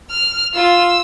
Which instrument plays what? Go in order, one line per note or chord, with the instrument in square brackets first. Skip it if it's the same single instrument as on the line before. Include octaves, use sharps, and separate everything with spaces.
[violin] F6
[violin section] F4 [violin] E6